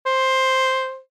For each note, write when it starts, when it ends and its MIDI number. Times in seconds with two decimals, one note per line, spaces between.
0.06 0.98 72